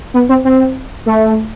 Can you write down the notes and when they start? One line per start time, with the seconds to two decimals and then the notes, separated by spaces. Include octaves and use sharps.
0.14 B3
0.29 C4
0.45 C4
1.06 A3